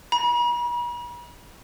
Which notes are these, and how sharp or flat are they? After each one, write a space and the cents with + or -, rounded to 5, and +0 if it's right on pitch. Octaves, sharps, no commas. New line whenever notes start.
B5 -45